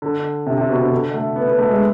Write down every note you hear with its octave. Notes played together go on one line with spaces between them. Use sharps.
D3
C3
C3
B2
C3
D3
A3
B3
B3
A3
G#3